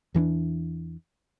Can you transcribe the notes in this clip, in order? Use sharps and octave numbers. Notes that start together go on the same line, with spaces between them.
E2 E3 C4 D4